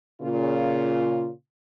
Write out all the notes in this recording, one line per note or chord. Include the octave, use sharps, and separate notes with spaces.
A#2 C#3 F4